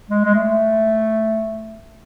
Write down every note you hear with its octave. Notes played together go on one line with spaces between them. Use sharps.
G#3
G#3
A3